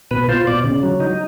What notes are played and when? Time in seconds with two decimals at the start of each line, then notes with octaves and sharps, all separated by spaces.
0.11 B2 B4
0.29 F4 C5
0.47 B2 D5
0.64 C#3
0.83 F#3
1.00 D#4